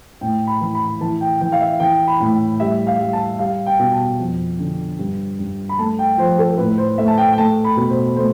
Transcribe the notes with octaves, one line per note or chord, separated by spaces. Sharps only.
A2 G5
B5
E3
B5
E3 A5
G5
E3 G5
F5
E5
E3 G5
B5
A2
G3 E5
F5
G3
A5
G3 F5
G5
B2
A5
F2
D3
G2
G2
B5
A3 A5
G5
F3 C5
A4
A2 B4
C5
A3 E5
A5
G5
G5
A3 A5
B5
B2
C5
A3 C5